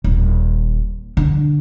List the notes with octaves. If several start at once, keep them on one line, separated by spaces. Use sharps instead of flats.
D#1
D3